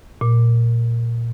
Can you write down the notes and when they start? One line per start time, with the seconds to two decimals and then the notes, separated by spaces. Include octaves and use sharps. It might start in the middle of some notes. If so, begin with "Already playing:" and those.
0.21 A#2